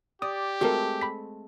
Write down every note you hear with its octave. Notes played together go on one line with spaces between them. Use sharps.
G4 D5 D#6
G#3 A3 C4 F#4 A#4
B5 B6